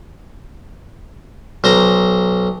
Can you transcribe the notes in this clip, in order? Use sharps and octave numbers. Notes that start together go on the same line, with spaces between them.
B1 C5 A#5